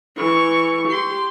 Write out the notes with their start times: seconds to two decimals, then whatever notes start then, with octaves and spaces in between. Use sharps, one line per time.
0.17 E3 C#6
0.88 G4 C6